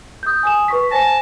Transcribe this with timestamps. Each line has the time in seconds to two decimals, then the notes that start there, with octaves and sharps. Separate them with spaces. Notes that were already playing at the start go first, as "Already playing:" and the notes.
0.23 D#6 G6
0.43 G#5 D#6 E7
0.68 B4 C#6 B6
0.91 C5 G#5 A5 A#6